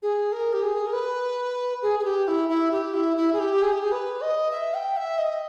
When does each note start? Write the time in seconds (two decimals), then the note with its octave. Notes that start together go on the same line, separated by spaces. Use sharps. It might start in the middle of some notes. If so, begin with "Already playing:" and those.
0.02 G#4
0.32 A#4
0.53 G4
0.62 G#4
0.87 A#4
0.93 B4
1.82 G#4
1.99 G#4
2.05 G4
2.28 E4
2.49 E4
2.72 G4
2.94 E4
3.17 E4
3.33 G#4
3.40 G4
3.62 G#4
3.72 G4
3.82 G#4
3.92 B4
4.22 D#5
4.51 E5
4.74 G5
4.97 E5
5.18 D#5